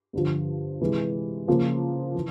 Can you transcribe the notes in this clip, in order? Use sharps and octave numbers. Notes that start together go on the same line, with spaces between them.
G2 D3 F3
C3 E3 G#3
C#3 F3 A#3
E3